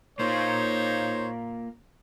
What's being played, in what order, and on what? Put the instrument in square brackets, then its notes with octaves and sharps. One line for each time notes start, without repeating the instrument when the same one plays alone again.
[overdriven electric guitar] A#3 F4 [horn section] D#4 C5 C#5